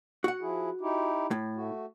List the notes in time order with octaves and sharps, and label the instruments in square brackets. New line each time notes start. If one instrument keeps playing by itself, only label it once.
[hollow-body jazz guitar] F#4 F#5
[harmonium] F3 E4 G#4
D#4 E4 G4
[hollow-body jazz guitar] A2
[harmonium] A3 F#4